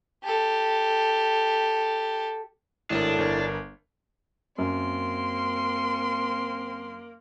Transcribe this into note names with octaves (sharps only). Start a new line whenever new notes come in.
G4 A4
G#1 A2 A3 D4 A#4
G1 A#4
F#2 A#3 C4 C6